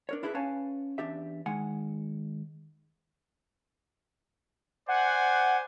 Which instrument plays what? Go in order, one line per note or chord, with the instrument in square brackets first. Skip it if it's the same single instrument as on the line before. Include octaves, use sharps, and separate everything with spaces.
[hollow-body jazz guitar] D4 A#4 C#5
D4 E4 G4 G#4 A#4 B4
C#4 B4 C#5 F5 G#5 A5
E2 D4 G4 E5
D#3 G#3 F#5 G#5
[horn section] C5 D5 G#5 [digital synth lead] F#5